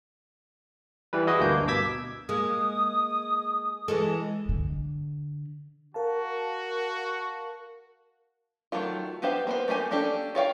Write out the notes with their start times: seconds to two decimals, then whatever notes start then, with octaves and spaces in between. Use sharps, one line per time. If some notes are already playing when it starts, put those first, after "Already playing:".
1.13 E3 G3 B4
1.27 E4 F#4 G#4 B4 D#5
1.40 D2 G2 A#3 G6
1.68 B2 D6 E6 G#6 B6
2.29 G#3 A#3 D#6
3.88 E3 G#3 A4
4.49 D3
5.94 F#4 A#4 F5 A5
8.72 D#3 F#3 A3 F4
9.22 B3 D4 G4 C5 F5
9.47 A#3 B3 C5
9.68 A3 A#3 G4 G#5
9.91 A#3 C#4 D4 G4 A4
10.35 F4 C#5 F5 G5